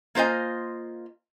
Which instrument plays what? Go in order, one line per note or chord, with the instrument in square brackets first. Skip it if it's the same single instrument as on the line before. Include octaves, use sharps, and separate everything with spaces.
[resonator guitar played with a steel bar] A#3 F4 C5 D#5 G#5